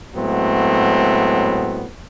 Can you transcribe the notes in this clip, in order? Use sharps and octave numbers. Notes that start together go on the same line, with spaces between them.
A2 F#3 G#3 A3 B3 C4